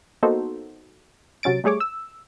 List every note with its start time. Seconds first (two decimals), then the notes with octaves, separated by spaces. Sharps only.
0.23 A#3 B3 D#4 F#4 A4 C5
1.43 C3 F#3 C#4 A6 D7
1.64 G3 A3 G#4 C#5 D6
1.80 E6